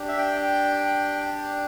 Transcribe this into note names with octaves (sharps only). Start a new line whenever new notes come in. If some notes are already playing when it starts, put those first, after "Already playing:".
Already playing: D4 G4
E5
G5